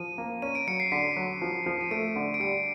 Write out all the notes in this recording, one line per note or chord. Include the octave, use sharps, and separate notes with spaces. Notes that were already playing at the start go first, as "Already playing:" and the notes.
Already playing: F3 D#7
A#3
C#4 D#7
D7
F#3 C#7
C7
D3 B6
F#3
F3
F3
D#7
A3 D7
D3
D7
G3 C#7